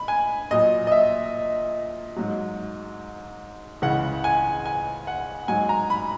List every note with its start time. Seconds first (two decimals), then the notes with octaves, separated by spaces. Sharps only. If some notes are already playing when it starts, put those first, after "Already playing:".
Already playing: B5
0.08 G#5
0.51 A#2 F#3 D#5
0.87 D#5
0.92 E5
2.16 G#2 F#3
3.82 C#2 C#3 E3 F#5
4.24 G#5
4.66 G#5
5.07 F#5
5.48 G#2 F#3 G#5
5.69 A#5
5.90 B5